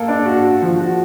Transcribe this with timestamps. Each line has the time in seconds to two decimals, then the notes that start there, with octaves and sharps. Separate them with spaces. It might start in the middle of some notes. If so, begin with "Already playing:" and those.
Already playing: A#3 A4
0.08 D4
0.26 F#4
0.43 F#4
0.62 F3
0.79 F#4